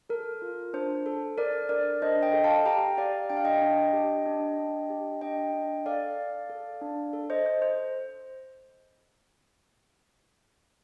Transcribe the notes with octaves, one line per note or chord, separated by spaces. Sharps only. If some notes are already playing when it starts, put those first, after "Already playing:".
A4 A#4
F4
D4 C5
A4
A4 A#4 D5
D4 A#4 D5
D4 C5 D#5
D#5 G5
A4
F5 A5
G4 G5 A#5
G4 D5 F5
D4 G5
F5
D#5 G5
D4
G4
D4
D4
G4
D4 D#5 G5
D4
A4 D5 F5
A4
A4
D4
A4
C5 D#5
A4 C5
C5